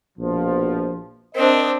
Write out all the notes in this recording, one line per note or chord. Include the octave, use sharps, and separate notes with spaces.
A#1 B2 F3
C4 D4 A#4 C5 D#5